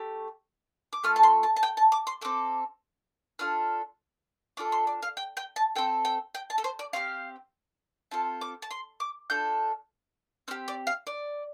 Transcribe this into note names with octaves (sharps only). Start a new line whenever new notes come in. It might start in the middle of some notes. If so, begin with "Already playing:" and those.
Already playing: A3 G4
D6
A3 F4 A4 F6
A5
C6
A5
A5
G5
A5
D6
C6
C4 A4 D6
D4 F4 A4 F6
D4 F4 A4 D6
C6
D5
F5
G5
G5
A5
C4 A4 G5
G5
G5
A5
A4
C5
D5
C4 G4 F5
C4 F4 A4 A5
D6
A5
C6
D6
D4 F4 A4 G6
C4 G4 F6
D5
F5
D5